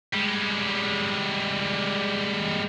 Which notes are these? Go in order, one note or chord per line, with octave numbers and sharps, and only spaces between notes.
G3 G#3